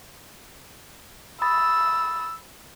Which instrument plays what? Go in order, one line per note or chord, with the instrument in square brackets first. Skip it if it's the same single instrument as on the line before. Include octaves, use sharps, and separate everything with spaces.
[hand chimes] B5 D#6 A6 [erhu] E6